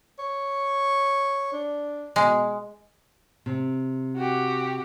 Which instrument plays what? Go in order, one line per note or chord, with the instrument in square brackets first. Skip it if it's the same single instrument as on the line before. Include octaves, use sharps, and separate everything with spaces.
[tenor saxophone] C#5
D4
[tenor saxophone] B2 [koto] G#3
[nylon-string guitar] C3
[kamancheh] F#4 G4